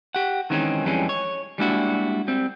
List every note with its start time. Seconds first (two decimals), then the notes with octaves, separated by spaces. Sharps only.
0.15 G4 F#5
0.50 D#3 E3 G#3 C4 C#4 D#4
0.85 F2 E3 G3 G#3 C4 C#4
1.09 C#5
1.58 G3 G#3 A#3 D4 E4 F#4
2.28 G3 C4